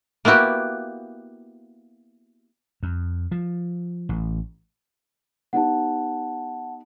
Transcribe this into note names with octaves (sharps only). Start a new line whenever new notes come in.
A#3 B3 E4 F#4 G4
F2
F3
A1
B3 D#4 G4 F#5 A5